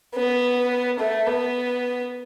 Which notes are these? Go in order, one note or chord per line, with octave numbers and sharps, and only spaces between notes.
B3
A3
B3